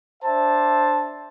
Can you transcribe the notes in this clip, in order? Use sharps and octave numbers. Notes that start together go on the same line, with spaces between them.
D4 C5 E5 A5